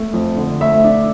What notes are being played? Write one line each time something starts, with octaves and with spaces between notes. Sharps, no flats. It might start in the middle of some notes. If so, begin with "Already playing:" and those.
Already playing: A3
F2
D3
A3 E5
D4